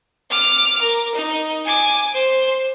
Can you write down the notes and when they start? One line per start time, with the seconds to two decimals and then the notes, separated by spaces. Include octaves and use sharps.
0.31 D6 F6
0.81 A#4
1.15 D#4
1.66 G#5 D6
2.14 C5